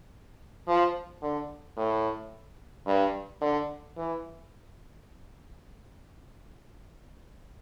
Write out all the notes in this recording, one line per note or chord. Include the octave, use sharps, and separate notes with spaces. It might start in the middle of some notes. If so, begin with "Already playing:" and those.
F3
D3
A2
G2
D3
E3